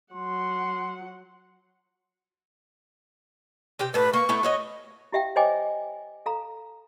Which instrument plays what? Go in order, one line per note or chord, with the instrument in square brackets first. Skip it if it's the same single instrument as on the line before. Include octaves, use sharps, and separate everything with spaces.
[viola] F#3 F#5 [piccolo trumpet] C6
[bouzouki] C3 G4 G5
[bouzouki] A2 D4 [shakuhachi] B4
[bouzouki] A#3 [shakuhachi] C#6
[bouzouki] A3 B3 E4
F#4 C#5 D#5
[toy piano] E4 G4 E5 F5 G5
C5 C#5 D#5 G5 G#5 D6
A4 F5 A#5